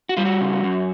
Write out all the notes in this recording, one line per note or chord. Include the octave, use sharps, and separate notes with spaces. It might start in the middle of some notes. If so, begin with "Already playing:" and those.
F#4
G3 F4
F#4
C#3
F#2